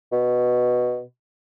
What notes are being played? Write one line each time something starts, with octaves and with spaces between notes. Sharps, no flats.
B2